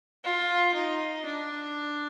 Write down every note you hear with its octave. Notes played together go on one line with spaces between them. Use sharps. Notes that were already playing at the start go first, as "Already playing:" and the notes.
F4
D#4
D4